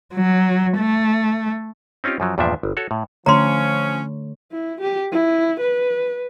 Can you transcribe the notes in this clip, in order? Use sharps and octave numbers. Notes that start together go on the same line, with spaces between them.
F#3
A3
C4 C#4 D#4 F4 G4
F#2 F3 F#3
E2 G2 A#2 F3 D4 E5
G1
F#4 A4 C#5
A2
D3 F3 A3 C#4 C#5 A#5 C6
E4
G4
E4
B4